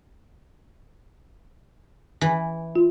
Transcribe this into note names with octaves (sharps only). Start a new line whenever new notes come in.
E3
F4